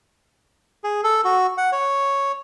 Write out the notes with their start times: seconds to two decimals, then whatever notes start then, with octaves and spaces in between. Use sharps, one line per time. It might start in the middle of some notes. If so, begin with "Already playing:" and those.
0.84 G#4
1.04 A4
1.25 F#4
1.57 F#5
1.72 C#5